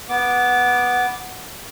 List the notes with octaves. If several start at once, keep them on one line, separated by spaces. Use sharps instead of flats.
B3 D6